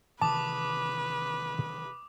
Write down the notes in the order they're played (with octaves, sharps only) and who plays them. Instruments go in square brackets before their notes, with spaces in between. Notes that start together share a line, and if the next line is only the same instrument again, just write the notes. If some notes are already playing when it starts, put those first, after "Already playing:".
[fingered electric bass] C3 D#3 E3 [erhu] B4 [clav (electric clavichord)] A5 [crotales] D6 D#6